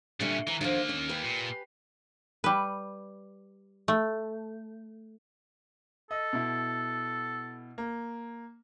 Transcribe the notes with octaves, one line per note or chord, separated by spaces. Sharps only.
A#2 D3 G3 C#4 E5
E3 A#5
D#2 D3 E3 F3 A#3
C#4
G4 B4 G#5
A#2
G3 B4
A3
A4 D#5
B2 E4
A#3